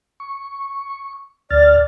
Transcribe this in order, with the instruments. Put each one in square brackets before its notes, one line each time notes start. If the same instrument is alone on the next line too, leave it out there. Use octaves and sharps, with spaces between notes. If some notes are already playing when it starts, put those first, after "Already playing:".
[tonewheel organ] C#6
[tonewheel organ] D2 F6 A6 [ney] D5